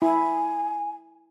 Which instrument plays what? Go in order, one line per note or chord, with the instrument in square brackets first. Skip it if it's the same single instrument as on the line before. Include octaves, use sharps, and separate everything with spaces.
[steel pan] E4 [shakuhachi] G#5